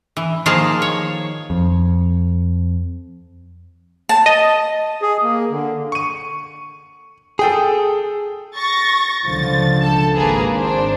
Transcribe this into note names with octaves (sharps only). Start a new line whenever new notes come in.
E3
D#3 F3 A#3 G#4 F5 A5
C#5
F2
A5
D#5
G#4
A#3
D3
C#6 D#7
G#4 A4 G5 D#6
C#6 A6 A#6
C#2 D3 F3 A6
A4 A5
G#1 A#3 G#4 B4
D4 C5